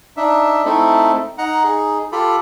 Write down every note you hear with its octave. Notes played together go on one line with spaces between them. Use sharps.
D4 D#4 E5
A3 C4 D#4 E4 A4
D#4 F#5 A#5
D#4 G#4
F4 G4 A4 B5